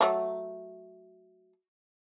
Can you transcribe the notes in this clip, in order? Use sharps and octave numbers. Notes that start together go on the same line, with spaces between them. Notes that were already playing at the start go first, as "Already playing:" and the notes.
F#3 A3